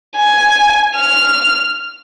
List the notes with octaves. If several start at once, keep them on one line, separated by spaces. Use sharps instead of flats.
G#5
F6